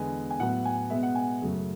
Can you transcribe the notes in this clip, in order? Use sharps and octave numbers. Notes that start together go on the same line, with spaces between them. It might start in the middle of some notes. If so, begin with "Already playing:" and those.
Already playing: E2 D3 G#3 B3 G#5
G#5
A2 F#3 B3 F#5
G#5
B2 G#3 B3 E5
F#5
G#5
F#2 C#3 F#3 A3